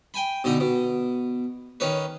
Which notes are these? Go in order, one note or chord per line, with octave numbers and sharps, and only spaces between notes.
G5 G#5 B5
B2 D3 D#4
B2
D#3 C#4 B4